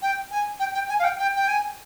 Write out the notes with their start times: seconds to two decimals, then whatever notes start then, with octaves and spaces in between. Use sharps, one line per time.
0.02 G5
0.31 G#5
0.60 G5
0.74 G5
0.89 G#5
0.99 F5
1.04 G5
1.19 G5
1.36 G5
1.48 G#5